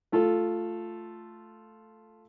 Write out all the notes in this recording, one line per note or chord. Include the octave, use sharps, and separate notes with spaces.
A3 F4 A4